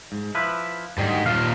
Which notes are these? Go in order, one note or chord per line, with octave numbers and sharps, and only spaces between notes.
G#2
F3 E4 B4
D2 G#2 D#3 G3
D#2 A#2 F5